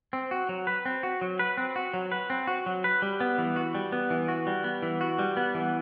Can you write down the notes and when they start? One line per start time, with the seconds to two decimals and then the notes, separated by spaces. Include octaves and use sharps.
0.13 C4
0.31 F#4
0.49 F#3
0.67 B4
0.85 C4
1.03 F#4
1.21 F#3
1.39 B4
1.58 C4
1.76 F#4
1.94 F#3
2.12 B4
2.30 C4
2.47 F#4
2.66 F#3
2.84 B4
3.02 G3
3.20 B3
3.38 E3
3.56 F#4
3.75 G3
3.92 B3
4.10 E3
4.28 F#4
4.47 G3
4.64 B3
4.82 E3
5.01 F#4
5.19 G3
5.37 B3
5.55 E3